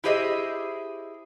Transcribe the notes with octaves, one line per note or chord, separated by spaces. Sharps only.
E4 G4 G#4 C5 D#5 E5